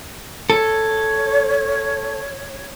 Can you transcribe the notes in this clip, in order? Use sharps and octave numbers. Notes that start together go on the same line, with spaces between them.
A4 C#5